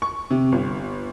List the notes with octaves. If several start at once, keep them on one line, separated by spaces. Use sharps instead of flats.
C#6
C3
G1